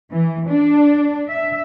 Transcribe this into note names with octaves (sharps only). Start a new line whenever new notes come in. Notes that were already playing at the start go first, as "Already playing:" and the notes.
E3
D4
E5